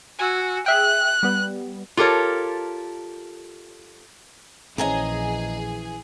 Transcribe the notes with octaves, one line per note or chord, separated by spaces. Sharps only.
F#4 G#5 E6
G#4 E5 G5 F#6
G3 B3
F4 G4 A4 A#4 C#5
A#1 E3 C4 C#4 G#4 D#5 G#5 A#5